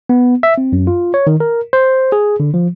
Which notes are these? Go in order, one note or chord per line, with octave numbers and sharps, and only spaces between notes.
B3
E5
C4
F#2
F4
C#5
D#3
A#4
C5
G#4
D3
F3